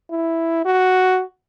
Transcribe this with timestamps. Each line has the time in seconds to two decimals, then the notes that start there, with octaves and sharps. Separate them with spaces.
0.11 E4
0.65 F#4